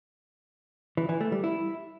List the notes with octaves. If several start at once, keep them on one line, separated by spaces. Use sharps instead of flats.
E3
E3
A3
G3
E4